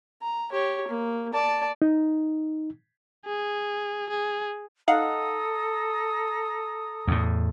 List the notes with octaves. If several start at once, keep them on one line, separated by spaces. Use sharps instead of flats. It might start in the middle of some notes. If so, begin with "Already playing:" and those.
A#5
G4 C#5
A#3
D5 A5
D#4
G#4
G#4
D#4 A4 F5 F#5 A#5 D#6
E2 A2